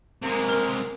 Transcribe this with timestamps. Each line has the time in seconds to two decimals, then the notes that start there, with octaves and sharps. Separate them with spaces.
0.23 C3 G#3 A#3
0.49 A#4 F6